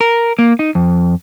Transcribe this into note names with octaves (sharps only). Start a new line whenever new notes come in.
A#4
A#3
D#4
F2